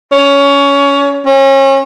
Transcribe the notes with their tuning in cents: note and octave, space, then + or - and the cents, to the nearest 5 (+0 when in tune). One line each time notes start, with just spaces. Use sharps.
C#4 +20
C#4 -35